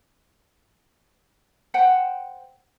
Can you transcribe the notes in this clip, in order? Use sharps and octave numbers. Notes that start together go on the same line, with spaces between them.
C5 F#5 G5